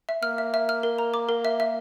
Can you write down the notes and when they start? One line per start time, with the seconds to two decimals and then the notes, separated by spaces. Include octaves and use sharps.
0.09 E5
0.23 A#3 F6
0.38 E5
0.54 E5
0.69 F6
0.83 A#4
0.98 A#5
1.14 D6
1.29 A#4
1.45 E5
1.60 E5